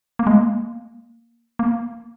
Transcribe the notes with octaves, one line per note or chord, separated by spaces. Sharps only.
A#3
G#3
A#3
A#3